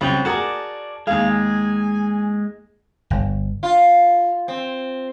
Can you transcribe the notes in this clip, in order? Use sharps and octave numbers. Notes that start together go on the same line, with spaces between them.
C2 C#3 F#3 C4 G5
F#4 G#4 A#4 D5 A5
D#2 G#3 G#4 F5
G#5
G1
F4
C4